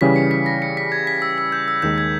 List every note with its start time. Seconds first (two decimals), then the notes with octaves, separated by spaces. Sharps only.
0.01 C#3 E3 G3 C#4 G#4 B6
0.16 C#7
0.31 B6
0.46 A#6
0.62 C#7
0.77 B6
0.92 G#6
1.07 B6
1.22 E6
1.38 E6
1.52 G6
1.68 E6
1.82 D#2 D#3 G#3 D#4 G6
1.98 G#6